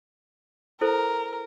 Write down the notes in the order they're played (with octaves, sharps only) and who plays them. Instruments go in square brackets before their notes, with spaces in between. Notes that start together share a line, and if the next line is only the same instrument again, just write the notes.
[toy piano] E4 A4 C5 [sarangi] A#4